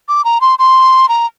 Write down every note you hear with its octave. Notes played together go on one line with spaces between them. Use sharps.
D6
A#5
C6
C6
A#5